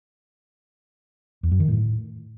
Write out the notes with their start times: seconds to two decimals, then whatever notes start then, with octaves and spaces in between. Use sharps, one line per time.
1.43 E2
1.52 F#2
1.60 D#3
1.68 A2